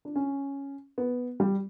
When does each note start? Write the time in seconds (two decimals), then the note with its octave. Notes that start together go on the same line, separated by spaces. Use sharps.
0.05 D4
0.16 C#4
0.98 B3
1.40 G3